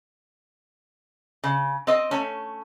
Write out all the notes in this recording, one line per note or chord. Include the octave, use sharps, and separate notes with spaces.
C#3
C4 D#5
A3 C#4